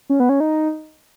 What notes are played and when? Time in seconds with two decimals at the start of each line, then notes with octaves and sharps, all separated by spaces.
0.10 C#4
0.20 B3
0.29 C#4
0.40 D#4